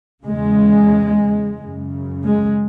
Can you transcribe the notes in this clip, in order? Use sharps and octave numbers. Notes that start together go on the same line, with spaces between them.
E2 C#3 G#3
F#2 C#3
G#3